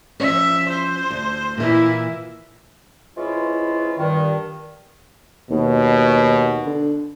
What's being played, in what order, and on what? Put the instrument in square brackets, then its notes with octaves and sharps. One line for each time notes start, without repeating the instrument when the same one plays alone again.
[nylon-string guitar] F3 C#4 [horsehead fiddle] E5
[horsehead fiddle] C5
[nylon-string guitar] D2
[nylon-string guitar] A#2 E3 [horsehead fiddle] A#3 E4
[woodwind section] G#2 E3 G#3 C#4 E4 F4
G2 D#3
[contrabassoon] D#2 [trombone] B2
[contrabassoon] D3